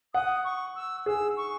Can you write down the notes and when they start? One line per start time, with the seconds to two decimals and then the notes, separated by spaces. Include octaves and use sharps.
0.14 F#5 D#6
0.44 C#6
0.75 E6
1.06 G#4 E6
1.36 C#6